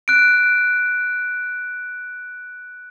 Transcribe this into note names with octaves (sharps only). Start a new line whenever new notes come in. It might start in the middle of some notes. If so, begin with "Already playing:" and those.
F#6 D7